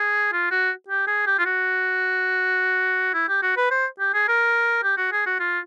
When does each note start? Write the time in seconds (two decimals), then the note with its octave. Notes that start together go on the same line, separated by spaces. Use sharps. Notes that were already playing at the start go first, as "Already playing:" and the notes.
Already playing: G#4
0.33 F4
0.51 F#4
0.88 G4
1.07 G#4
1.27 G4
1.38 F4
1.45 F#4
3.14 E4
3.29 G4
3.42 F#4
3.57 B4
3.71 C5
4.00 G4
4.14 G#4
4.28 A#4
4.83 G4
4.97 F#4
5.13 G#4
5.26 F#4
5.40 F4